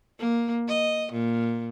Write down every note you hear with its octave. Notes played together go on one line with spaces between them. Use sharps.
A#3
D#5
A#2